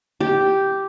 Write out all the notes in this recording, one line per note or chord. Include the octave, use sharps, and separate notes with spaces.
G4